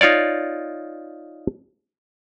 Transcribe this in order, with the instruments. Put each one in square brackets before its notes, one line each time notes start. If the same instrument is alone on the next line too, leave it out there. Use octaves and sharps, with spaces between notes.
[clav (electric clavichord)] D#4 F4 C#5 D5